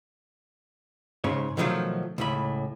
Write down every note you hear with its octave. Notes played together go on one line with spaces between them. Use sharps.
G#2 C#3 C#5
B2 D3 D#3 F3 F#3 A3
C#2 A2 B5